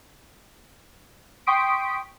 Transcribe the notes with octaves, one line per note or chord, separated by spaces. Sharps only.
G5 C6 C#6 D#6 B6 D7